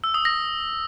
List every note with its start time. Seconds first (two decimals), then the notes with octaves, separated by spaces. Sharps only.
0.04 E6
0.14 D#6
0.25 A#6